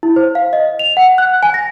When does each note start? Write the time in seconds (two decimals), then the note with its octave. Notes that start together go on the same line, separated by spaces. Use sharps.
0.03 E4
0.16 C5
0.35 F5
0.53 D#5
0.79 F7
0.97 F#5
1.18 F#6
1.43 G#5
1.54 A#6